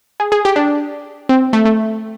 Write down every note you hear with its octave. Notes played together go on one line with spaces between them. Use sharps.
G#4
G#4
G4
D4
C4
A3
A3